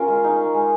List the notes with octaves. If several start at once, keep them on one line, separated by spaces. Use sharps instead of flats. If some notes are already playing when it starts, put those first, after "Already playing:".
Already playing: C#4 F4 A#4
G#3
D#4
G#3
G#3